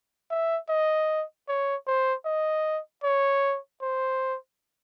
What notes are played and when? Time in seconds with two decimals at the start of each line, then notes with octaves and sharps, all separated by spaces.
0.30 E5
0.69 D#5
1.48 C#5
1.87 C5
2.25 D#5
3.03 C#5
3.82 C5